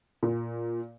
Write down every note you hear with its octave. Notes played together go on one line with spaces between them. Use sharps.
A#2